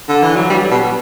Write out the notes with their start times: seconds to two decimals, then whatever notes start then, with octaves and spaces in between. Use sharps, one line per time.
0.09 D3
0.23 E3
0.36 F#3
0.50 G3
0.71 B2